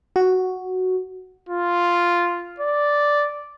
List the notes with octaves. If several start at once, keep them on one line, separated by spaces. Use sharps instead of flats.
F#4
F4
D5